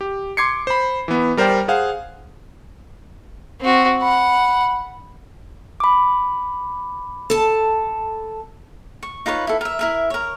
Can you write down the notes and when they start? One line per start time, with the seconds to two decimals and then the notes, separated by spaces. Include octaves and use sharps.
0.01 G4
0.37 C6 D6 G#6 C7 C#7
0.67 C5 B5
1.08 E3 B3
1.37 G3 A#4 C5 D5 G5
1.68 G#4 C5 F5 F#5
3.61 C4 F#4
4.02 F#5 B5
5.80 B5 D6
7.30 A4 A5
9.03 C#6
9.26 D#4 F4 B4 C#5
9.47 E4 A4
9.61 A#4 E5
9.79 E4 A#4 E5
10.10 A#4 C#5